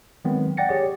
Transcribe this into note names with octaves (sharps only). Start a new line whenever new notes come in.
D#3 F#3 G#3 B3 C4
D5 F#5 G5 A6 A#6 C#7
G4 G#4 C#5 D5